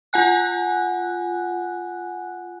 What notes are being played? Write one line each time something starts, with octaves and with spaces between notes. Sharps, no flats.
F4 F#5 G#5 F#6